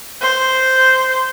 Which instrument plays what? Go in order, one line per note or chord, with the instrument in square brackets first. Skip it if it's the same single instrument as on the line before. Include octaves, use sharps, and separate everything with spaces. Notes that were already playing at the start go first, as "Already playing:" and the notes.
[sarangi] C5